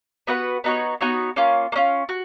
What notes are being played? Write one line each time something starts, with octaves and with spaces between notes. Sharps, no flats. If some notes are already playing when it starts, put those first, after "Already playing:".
B3 F#4 B4 F#5
B3 D#4 F#4 C#5
B3 D#4 F#4 C#5
A#3 C#4 F4
A#3
C#4 F4
F#4